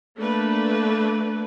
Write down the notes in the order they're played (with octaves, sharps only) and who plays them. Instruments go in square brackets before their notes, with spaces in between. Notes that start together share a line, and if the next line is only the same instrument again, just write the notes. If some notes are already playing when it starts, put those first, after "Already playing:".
[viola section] A3 A#3 D4 B4